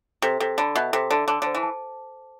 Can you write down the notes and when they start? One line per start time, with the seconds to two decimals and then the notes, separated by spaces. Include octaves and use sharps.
0.22 C3 A4
0.40 C3 A4
0.58 D3 B5
0.76 B2 E5
0.93 C3 A4
1.11 D3 A4
1.28 D3 D6
1.42 D3 C5
1.55 E3
1.63 A5